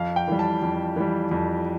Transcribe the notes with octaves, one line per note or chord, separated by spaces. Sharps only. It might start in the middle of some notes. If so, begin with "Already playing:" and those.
Already playing: F2 F5
G5
E3 G3
A5
F2
E3 G3
F2